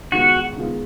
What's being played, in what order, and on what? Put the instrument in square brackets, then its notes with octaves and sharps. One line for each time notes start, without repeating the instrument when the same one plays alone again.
[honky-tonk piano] D#3 G#3 B3 F4 [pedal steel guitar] F#4
[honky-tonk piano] D#3 G#3 B3 F4